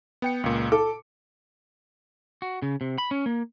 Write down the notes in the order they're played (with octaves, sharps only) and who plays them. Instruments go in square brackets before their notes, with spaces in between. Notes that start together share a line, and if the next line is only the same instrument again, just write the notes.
[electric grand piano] B3 G5 C#7
C#2 A#2
[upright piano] A4 [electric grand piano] D6
[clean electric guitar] F#4
C#3
C3
B5
C#4
A#3